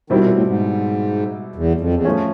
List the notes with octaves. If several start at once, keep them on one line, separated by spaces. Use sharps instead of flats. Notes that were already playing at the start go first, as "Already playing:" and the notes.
B2 D#3 G3 C4 E4
A#2
A2
G#2
E2
F2
E2
F3 A3 C#4